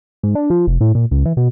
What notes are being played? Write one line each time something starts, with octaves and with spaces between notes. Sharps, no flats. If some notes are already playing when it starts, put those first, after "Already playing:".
G#2
D4
F3
F1
A2
A#2
C#2
E3
B2